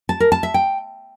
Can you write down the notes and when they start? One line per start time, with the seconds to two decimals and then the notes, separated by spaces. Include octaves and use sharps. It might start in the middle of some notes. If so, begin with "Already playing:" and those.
0.09 A5
0.20 A#4
0.32 A5
0.43 E5
0.54 G5